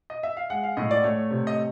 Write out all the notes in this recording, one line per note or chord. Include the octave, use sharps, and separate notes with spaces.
D#5
E5
F5
G#3 F#5
F5
A2 D#5
D5
A3 C#5
C3
D#5